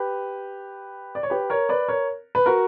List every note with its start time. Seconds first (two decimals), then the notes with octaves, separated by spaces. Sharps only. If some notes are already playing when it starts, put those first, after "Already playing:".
Already playing: G4 B4
1.15 D5
1.23 C#5
1.30 G4 B4
1.50 A#4 C#5
1.69 B4 D5
1.88 A#4 C#5
2.35 B4
2.46 F#4 A#4